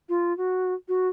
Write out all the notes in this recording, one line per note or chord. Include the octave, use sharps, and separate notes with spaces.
F4
F#4
F#4